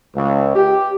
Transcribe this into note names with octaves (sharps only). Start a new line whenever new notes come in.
C#2
G4